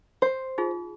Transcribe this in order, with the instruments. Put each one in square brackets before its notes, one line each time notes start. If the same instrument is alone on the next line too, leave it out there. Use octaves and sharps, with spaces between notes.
[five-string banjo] C5
[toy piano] D#4 F4 G#4